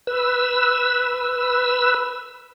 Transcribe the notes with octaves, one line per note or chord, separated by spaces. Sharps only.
B4 E6